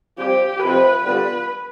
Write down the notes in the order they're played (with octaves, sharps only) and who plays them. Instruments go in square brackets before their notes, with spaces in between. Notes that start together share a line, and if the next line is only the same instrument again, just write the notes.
[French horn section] G3 C4 F4 [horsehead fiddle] G4
[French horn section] F2 C3 F3 C4 [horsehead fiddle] B4
[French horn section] D3 G3 B3 F4 [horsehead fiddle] B4